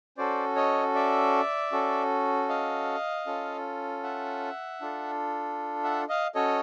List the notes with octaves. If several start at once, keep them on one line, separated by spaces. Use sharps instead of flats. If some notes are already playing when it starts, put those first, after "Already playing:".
C#4 F#4 A4 C5 D5
C#5 D#5
D5 E5
C#4 F#4 A4
D#5 F5
C#4 F4 A4
E5 F#5
D4 F4 A4
E5 F#5
D#5 F5
C#4 F#4 A4 C#5 D#5